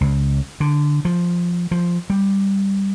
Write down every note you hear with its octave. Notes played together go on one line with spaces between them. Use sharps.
C#2
D3
F3
F3
G3